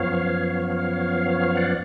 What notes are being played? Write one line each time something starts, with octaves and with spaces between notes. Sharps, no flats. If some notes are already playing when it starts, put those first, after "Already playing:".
Already playing: F#2 F3 B3 C#5 F5
D5 F#5